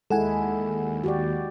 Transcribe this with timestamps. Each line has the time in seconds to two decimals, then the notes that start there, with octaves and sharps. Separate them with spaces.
0.10 D#2 G#3 E4 A4 F#5 G#5
1.04 F#4 G4 D5